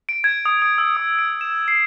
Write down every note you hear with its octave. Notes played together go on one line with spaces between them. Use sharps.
D7
G#6
D#6
D#6
E6
D#6
D7
E7
C7